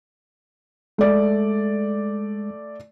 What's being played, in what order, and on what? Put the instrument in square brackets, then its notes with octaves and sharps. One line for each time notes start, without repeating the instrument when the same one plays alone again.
[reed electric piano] G#3 [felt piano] A3 D5